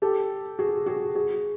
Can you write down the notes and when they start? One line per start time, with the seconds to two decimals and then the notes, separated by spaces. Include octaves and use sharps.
0.02 G4 A4
0.59 F#4 G#4
0.86 F#4 G#4
1.15 F#4 G#4